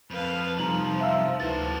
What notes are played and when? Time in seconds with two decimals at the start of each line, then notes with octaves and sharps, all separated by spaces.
0.11 F2 B4 F5
0.59 C3 F3 G3 D#4 A#5 F#7
1.01 E5 F5 E6
1.40 D2 E4 F#4 A4 B4 A6